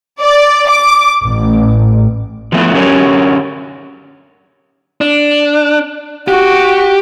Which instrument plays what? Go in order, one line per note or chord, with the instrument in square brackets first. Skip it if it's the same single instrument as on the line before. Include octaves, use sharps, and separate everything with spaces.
[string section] D5
D6
A1
[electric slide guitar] E3 F3 A3 B3 E4
F#2 D3 C#4 G4 A#4 C#5
[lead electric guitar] D4
[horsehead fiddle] F#4 [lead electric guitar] G4